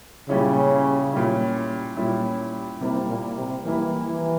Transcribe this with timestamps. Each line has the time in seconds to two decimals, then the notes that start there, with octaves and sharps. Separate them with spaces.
0.29 A#2 C#3 G3 C#4 E4
1.13 A#2 G3 C#4 E4
1.97 A#2 G3 C#4 E4
2.81 C3 G3 A#3 E4
3.09 A#2
3.37 C3
3.65 E3 G3 A#3 E4
4.08 E3